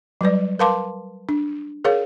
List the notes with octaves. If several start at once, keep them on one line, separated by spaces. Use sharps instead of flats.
F#3 G3 B4 D5
A#4 B4 F5 A5 C6 D6
D4
G#4 A#4 C#5 F5